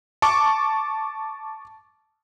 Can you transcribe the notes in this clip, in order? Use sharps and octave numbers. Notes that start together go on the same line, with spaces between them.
A5 C#6 D6